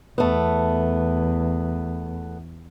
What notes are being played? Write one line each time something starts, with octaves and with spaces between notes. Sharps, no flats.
E2 A3 B3